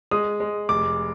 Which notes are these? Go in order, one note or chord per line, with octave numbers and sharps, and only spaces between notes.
G#3 D#6
G#3
F1 D6